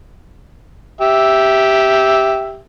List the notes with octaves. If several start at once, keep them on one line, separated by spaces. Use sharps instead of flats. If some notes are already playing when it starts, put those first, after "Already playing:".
G4 E5